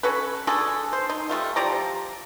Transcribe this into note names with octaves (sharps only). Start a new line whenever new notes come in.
C#4 F#4 A4 B4
D3 F#4 G#4 A4
C5
D#4
G3 A3 F4
F3 G4 D5 A#5